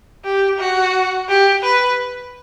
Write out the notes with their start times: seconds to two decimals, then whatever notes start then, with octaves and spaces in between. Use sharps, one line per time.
0.24 G4
0.59 F#4
1.28 G4
1.63 B4